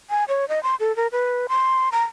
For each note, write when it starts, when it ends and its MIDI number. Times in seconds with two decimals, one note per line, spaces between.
0.10 0.24 80
0.28 0.48 73
0.49 0.62 75
0.63 0.75 84
0.80 0.95 69
0.96 1.07 70
1.12 1.47 71
1.49 1.89 84
1.92 2.04 82